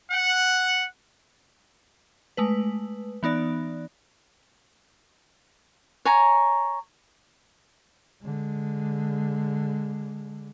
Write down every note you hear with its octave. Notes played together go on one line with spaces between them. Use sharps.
F#5
G#3 A3 B4
E3 B3 D#4 D5
C#5 G#5 A#5
D3 G#3